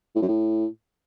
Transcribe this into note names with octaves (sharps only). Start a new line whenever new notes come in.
A2
F#2
A2